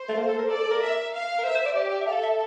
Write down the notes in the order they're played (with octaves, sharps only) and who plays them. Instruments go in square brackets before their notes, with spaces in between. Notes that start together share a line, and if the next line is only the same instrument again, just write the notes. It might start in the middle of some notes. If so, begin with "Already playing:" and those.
Already playing: [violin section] C5
[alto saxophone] A3
A#3
A4
A#4
[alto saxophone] A4 [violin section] D5
[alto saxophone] A4
A#4
[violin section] E5
F5
[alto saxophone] A#4
[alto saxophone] C5 [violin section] E5
[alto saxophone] C5
D5
[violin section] G4 [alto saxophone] D5
[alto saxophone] D5
E5
[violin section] A4 [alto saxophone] F5
[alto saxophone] E5